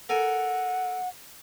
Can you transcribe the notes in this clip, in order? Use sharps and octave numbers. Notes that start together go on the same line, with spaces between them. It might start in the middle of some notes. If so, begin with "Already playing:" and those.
A4 A#4 F#5 G#5